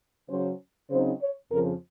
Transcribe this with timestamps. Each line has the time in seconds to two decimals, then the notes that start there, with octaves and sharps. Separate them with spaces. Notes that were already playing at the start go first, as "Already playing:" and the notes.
0.30 C#3 F#3 C#4 C5
0.90 C#3 F#3 C4 D#4 C5
1.21 C#5
1.51 F2 C#3 F3 A#4